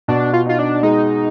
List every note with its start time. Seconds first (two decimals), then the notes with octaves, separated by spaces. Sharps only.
0.08 B2 D4
0.34 F4
0.46 D#4 F4
0.59 D4
0.83 G#3 D#4